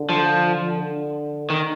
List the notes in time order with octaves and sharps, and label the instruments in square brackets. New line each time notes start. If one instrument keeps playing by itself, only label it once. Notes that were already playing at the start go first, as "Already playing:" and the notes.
Already playing: [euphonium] D3
[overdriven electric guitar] F3
[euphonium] D3
[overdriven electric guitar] D#3